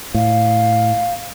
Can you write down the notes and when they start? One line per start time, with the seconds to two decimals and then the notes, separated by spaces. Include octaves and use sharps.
0.14 A2 F5